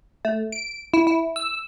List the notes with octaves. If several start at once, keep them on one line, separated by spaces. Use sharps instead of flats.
A3
D7
E4
E4
E6